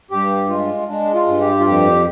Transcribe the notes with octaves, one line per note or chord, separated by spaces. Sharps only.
G2 G4
G#3 F4
G#3 D4
F4
G2
G4
F4
F2 G4